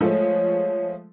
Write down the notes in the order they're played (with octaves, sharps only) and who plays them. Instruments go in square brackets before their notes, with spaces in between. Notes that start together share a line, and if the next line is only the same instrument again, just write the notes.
[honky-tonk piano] F3 G#3 A3 [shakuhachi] C#5